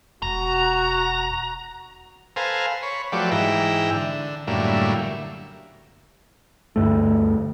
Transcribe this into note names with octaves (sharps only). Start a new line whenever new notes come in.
E1 F#4 A#5
A4 B4 C5 F5 G#5 A#5
C#5 B5
F3 F#3 A3 G4 B4 D5
G#2 E3 E5 G5 A#5
D3
F#2 A2 D3 G3 A#3 E4
D2 G2 A3